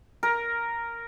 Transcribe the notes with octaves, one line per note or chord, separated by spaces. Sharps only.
A#4